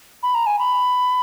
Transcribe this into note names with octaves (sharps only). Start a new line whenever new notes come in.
B5
A#5
G#5
B5